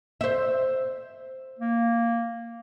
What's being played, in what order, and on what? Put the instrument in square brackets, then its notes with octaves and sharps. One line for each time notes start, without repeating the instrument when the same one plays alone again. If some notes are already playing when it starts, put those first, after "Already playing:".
[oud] C5 E5
[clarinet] A#3